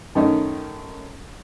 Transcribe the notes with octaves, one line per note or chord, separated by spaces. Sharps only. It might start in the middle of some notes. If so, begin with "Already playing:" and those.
F#2 D#3 A3 C#4 D#4